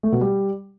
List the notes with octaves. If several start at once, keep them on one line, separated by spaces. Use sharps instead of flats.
A3
B2
G3